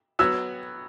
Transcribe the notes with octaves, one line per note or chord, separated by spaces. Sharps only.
F#3 B3 F#4 C#5 E6